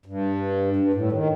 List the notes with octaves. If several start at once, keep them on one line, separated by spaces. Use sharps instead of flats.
G2
G2
A2
D#3